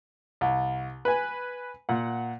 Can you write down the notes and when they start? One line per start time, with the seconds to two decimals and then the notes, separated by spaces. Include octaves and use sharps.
0.41 C2
1.05 B4 G#5
1.89 A#2 F#5